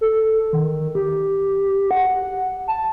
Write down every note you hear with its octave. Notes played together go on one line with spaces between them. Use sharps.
A4
D#3
G4
F#5
A5